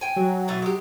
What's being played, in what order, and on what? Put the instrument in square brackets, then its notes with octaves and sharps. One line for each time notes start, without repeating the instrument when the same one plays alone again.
[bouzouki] G5 G#5
[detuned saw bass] F#3
[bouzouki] B2 E3 A3
G#3 G4